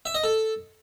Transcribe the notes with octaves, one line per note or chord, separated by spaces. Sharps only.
E5
D#5
A4